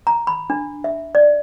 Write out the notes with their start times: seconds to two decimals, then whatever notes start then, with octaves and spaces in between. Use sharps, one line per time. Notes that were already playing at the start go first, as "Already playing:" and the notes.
0.07 A#5
0.27 B5
0.50 D4
0.84 E5
1.15 D5